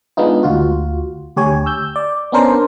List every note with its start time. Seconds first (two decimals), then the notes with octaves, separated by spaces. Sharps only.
0.17 G#3 B3 D4 D#4 F4
0.43 D2 F4 F#4
1.36 D2 G4 C#5 G#5
1.66 E6 G6
1.96 D5
2.32 B3 C#4 D4 A#4 C5